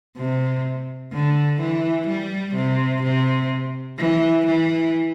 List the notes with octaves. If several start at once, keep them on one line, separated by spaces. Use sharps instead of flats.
C3
D3
E3
G3
C3
C3
E3
E3